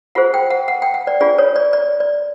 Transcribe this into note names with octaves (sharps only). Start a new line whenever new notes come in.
F4 G#4 C5 F#5
G5
F#5
F#5
G5
F#5
D5
D4 F4 G#4 D5
C#5
D5
D5
D5